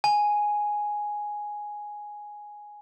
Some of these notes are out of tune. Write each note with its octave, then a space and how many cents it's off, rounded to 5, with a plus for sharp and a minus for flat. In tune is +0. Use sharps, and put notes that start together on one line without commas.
G#5 +0